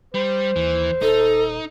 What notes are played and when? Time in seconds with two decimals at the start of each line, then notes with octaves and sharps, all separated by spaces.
0.14 G3 C5
0.56 D#2 E3
1.02 D#1 D#4 A4